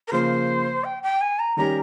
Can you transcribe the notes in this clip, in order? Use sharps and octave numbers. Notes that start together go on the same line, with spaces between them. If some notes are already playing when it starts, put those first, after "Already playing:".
A#4
C#3 F3 A#3 C5
G5
G5
G#5
A#5
D#3 G3 C#4 G4 A#5